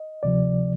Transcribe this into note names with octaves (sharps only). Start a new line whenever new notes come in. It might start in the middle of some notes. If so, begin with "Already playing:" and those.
Already playing: D#5
D2 C3 F3 D5